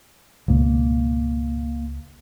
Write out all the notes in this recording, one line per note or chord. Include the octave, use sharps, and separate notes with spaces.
C#2 G#2 B2 A#3